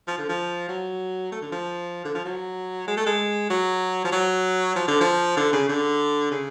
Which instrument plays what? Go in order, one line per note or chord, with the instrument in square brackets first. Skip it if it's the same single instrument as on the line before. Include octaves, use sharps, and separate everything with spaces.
[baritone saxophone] F3
D3
F3
F#3
A3
D3
F3
D3
F3
F#3
G#3
A3
G#3
F#3
F3
F#3
F3
D3
F3
D3
C#3
D3
C#3